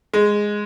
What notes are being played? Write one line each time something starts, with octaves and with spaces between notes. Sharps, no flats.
G#3